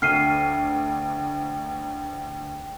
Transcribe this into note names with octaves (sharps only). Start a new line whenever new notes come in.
D2 G5 F6 C7 D#7